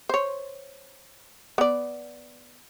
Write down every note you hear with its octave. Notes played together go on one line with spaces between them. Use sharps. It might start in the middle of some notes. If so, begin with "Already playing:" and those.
C5 C#5
B3 D5